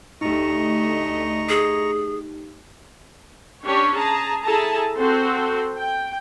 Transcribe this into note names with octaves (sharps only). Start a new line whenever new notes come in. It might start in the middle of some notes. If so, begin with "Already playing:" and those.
D2 A3 D#4 G4 D#5 A#5 C#6
G#4
C#4 D4 G4 C#5
G#4 A5 A#5
E4 G#4 A4 A5 A#5
C4 F#4 A4 C5
G5